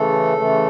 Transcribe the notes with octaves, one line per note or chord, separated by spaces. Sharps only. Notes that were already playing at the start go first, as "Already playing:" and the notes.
Already playing: C#3 E3 A3 A4
C#3 E3 A3